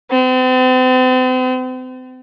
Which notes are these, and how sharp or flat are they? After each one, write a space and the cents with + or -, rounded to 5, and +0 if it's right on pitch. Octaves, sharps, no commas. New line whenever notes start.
C4 -40